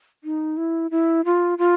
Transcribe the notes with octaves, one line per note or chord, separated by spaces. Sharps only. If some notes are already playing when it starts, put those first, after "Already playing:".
D#4
E4
E4
F4
F4